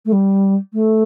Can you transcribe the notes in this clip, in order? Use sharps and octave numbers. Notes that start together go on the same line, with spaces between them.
A3
G3
A3